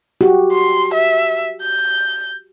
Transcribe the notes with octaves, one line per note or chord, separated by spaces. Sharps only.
F#4 G4
C6
E5
G6